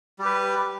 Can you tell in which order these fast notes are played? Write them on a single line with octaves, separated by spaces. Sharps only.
G3 G4 B4